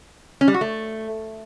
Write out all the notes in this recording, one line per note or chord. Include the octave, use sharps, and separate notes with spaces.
C#4
G3
F#4
A3